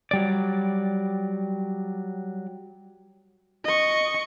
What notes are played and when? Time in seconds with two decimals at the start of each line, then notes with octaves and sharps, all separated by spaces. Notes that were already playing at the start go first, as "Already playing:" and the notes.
0.11 F#3 G3 D5
3.64 D#5 C#6